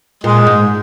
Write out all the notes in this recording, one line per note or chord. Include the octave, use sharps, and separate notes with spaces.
A#2 G#3
G#2